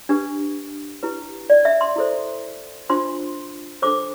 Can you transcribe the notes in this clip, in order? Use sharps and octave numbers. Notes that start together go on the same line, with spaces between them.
D4 G4 B4
E4 G4 B4
D5
E5
C6
E4 A4 C5
D4 F4 C5 C6
D4 A4 C5 D6